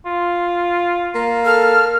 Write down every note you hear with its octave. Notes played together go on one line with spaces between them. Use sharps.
F4
A#3
A4 F6